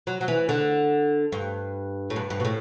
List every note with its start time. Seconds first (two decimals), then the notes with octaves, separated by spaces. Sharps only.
0.07 F#3
0.21 F#3
0.28 E3
0.49 D3
1.32 G2
2.10 A2
2.16 G2
2.30 G2
2.40 B2
2.45 A2